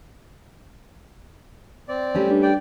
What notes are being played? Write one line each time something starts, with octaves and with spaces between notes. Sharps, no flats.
C4 D5
G3 A3 C#4
G2
D5 G5